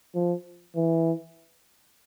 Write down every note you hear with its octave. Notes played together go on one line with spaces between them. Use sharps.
F3
E3